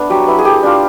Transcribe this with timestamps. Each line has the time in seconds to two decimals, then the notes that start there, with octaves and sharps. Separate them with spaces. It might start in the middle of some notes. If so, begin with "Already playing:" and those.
Already playing: A3 B3 D4
0.10 F#3 G4
0.28 B3 E4
0.39 G#4
0.45 A3 G4
0.63 D4 F4